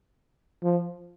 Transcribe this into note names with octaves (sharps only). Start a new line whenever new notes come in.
F3